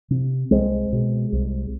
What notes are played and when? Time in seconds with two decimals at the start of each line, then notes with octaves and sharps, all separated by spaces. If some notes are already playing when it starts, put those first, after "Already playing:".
0.10 C3
0.51 C2 G#3 C4
0.93 B2
1.32 C2